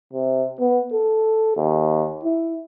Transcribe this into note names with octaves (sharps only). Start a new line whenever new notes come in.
C3
B3
A4
D#2
E4